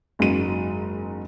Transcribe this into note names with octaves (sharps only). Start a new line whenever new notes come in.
F#1 G#2 F#4 D#7